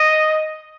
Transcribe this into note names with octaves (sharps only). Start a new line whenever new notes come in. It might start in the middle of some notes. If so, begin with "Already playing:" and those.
Already playing: D#5